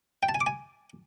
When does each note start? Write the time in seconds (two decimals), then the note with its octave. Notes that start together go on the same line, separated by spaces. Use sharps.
0.23 G5
0.29 A5
0.35 G#5
0.41 D6
0.47 G#5